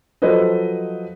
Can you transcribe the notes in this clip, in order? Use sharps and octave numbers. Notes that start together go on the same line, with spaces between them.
F3 F#3 A4 B4 C5 D#5